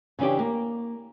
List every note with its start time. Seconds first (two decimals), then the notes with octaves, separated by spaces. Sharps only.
0.19 C#3 E3 C#4 D4 G4
0.39 A#3